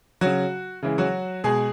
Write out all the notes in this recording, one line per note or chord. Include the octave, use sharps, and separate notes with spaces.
C#3 F#3 F#4
C#3 E3 G#3
F#3 F#4
B2 G#3 G#4